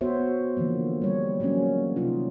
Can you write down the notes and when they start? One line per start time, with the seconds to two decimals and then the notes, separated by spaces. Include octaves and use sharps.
0.01 B3 F#4 C5 C#5 E5
0.57 D3 E3 F3 A#3
1.02 G3 C#5
1.40 F#3 G#3 A#3 C4 C#4
1.96 C3 D#4 F4